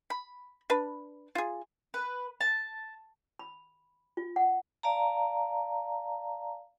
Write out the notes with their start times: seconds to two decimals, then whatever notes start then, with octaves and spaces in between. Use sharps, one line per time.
0.10 B5
0.70 D4 B4
1.35 F4 G#4
1.94 B4
2.41 A5
3.39 B5
4.17 F4
4.36 F#5
4.83 D5 F5 A5 A#5